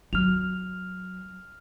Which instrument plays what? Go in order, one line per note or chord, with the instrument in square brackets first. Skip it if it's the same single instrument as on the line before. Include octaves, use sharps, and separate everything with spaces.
[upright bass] F#3 [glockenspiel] F6 F7